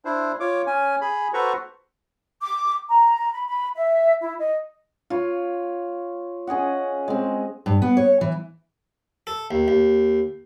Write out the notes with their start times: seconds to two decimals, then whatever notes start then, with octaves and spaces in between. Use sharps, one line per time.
0.05 D4 E4 C5
0.40 F4 C#5 D6
0.67 C#4 G#5
1.01 G#4 B5
1.34 F#4 A4 B4 C5 A#5 C#6
2.42 D6
2.89 A#5
3.33 B5
3.47 B5
3.76 E5
4.21 E4
4.40 D#5
5.10 F4 C#5
6.47 C#4 G#4 D#5 F#5
7.08 G#3 C4
7.66 G2
7.82 B3
7.97 C#5
8.21 E3
9.27 A4
9.51 D#2
9.68 D#2